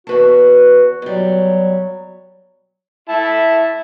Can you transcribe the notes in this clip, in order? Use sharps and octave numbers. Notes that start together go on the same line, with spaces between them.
E2 F#4 B4 A5
B2 F#3 G3
E4 A5